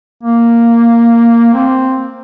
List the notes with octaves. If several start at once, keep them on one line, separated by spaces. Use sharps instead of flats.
A#3
C4